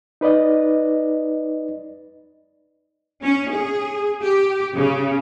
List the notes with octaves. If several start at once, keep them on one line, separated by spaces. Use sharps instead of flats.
D#4 B4 D5 D#5
C#4
G#4
G4
C#3